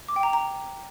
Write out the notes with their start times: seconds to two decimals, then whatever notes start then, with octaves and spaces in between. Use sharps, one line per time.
0.08 D6
0.16 G5
0.23 A#5
0.33 A#5